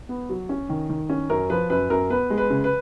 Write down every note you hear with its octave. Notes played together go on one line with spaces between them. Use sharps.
B3
F#3
C#4
D#3
D#3
C#4
F#2 A#4
F3 B4
F#2 B4
F#2 A#4
B3 B4
G#3
B4
C#3
B4